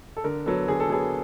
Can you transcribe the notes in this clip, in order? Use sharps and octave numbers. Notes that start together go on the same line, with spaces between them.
A4
D3 A#4
F#3 B3 A4
D3 G#4
A4
F#3 B3 G#4